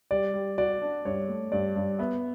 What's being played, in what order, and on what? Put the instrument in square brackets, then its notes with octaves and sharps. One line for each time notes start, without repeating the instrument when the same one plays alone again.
[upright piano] G3 [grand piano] D5
[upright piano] G3
[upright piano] F#4 [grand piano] D5
[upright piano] D4
[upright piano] G2 [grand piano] C#5
[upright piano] A3
[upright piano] G2 [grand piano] D5
[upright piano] G2
[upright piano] B3 [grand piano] E5